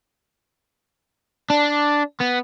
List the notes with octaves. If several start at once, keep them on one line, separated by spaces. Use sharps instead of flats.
D4
B3